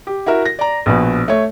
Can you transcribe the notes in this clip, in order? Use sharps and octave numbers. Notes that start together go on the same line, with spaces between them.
G4
E4 F#4 A#4 E5
A#6
D5 A#5
A#1 B2 B4
A3 C#5